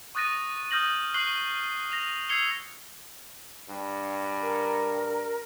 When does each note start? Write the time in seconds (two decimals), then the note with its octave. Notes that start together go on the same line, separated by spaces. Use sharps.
0.15 C#6 D#6 F#6 A6 A#6 D#7
0.71 D#6 F6 G6 A#6 F#7
1.14 C#6 F6 F#6 C7 F#7 G7
1.92 A#6 F7
2.29 E6 G#6 C7 C#7 F7 G7
3.70 G2
4.41 A#4